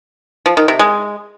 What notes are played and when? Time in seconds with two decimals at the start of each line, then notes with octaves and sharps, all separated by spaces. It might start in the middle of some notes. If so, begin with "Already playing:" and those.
0.46 F3
0.57 D#3
0.68 C3
0.79 G#3